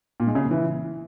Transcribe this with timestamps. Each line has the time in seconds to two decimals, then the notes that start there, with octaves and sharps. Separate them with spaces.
0.20 A#2
0.27 G#3
0.35 C#3
0.43 A#2
0.51 E3